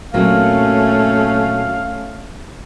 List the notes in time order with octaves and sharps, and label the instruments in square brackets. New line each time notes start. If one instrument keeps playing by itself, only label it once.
[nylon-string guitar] A#2 F#3 C4 [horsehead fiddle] A3 C#4 [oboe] F5